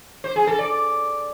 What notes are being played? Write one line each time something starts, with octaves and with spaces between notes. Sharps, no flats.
C5
G#4
A4
D5